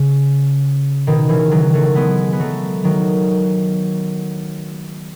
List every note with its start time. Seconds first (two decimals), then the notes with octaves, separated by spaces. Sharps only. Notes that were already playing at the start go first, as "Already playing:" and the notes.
Already playing: C#3
1.07 B2 D#3
1.29 C#3 E3
1.51 D#3 F#3
1.74 F#3 A3
1.96 G#3 B3
2.33 B3
2.40 F#3 A3
2.84 D#3 F#3